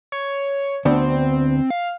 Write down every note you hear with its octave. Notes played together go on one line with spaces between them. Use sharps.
C#5
D2 B3 C4 D4
F5